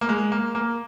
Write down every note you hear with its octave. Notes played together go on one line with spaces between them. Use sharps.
A#3
G#3
A#3
A#3